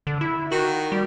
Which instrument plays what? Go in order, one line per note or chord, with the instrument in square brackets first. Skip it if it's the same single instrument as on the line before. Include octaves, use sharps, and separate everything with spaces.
[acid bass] D3
E4
[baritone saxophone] D#3 [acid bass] F#4
[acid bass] G3